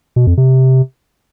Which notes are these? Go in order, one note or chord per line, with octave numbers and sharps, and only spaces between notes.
B2
F2
C3